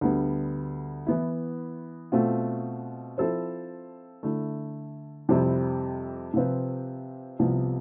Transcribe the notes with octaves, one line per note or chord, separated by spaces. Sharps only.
D2 D3 G3 B3
E3 B3 E4
B2 A3 C4 F4
F3 C4 E4 A4 C5
D3 A3 E4
F2 C3 G3 C4 E4
C3 F3 C4 F4 B4
C2 C3 F3 B3